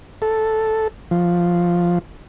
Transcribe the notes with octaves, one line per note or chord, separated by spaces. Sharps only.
A4
F3